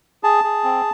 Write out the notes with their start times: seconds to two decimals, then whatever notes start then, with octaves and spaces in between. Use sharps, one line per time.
0.23 G#4 A5
0.44 G#4
0.64 C4